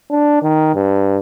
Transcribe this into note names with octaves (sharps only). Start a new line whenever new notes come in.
D4
D#3
G2